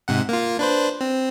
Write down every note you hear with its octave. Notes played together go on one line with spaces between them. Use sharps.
G#2 C3 F#5
A#3 F4
D4 B4 C5
C4